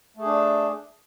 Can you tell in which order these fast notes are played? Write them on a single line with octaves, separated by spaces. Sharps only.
A3 G#4 D4